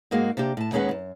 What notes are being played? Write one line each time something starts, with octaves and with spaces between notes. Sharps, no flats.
G#2 G#3 A#3 F#4
C3 A#3 D4 G4
A2 A5
D#2 D#3 G#3 C#4 B4 F#5
F#2